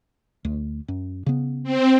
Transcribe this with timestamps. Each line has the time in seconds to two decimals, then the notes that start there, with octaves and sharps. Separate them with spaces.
0.45 D2
0.88 F#2
1.26 C#3 B3
1.64 C4